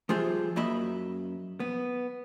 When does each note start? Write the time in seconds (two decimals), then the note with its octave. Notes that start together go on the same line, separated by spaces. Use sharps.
0.09 F3 G3 F4 G#4 C5 E5
0.56 F#2 F#3 A#3 D#5 E5 B5
1.60 B3